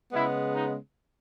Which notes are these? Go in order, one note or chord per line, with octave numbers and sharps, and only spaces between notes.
C#3 G#3 B3 E4
D#4